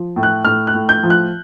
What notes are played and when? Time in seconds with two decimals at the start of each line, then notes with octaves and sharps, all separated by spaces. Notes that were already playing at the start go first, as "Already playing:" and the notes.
Already playing: F3
0.16 A2
0.23 F#6
0.45 A2 F6
0.67 F#6
0.74 A2
0.89 G6
1.03 F3
1.10 F#6